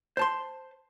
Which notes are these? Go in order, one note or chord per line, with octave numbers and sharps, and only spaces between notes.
C5 A5 C6